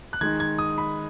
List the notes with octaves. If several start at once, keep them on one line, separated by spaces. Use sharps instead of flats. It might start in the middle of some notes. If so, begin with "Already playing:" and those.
F#6
D#3 G#3 D#4 G#6
G#6
D#6
B5